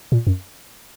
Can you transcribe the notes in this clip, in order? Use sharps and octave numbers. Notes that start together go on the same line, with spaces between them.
A#2
F#2